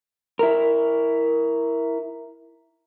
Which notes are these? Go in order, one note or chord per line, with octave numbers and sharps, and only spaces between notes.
E4 A#4